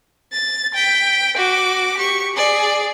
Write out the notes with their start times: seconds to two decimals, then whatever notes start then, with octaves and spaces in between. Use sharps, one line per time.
0.32 A6
0.74 G5 B6
1.37 F#4 D6
1.97 G4 C#6
2.35 G#4 D5